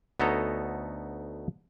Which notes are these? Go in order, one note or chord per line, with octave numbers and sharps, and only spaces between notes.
D2 B3 D#4 A4 C#5 A#5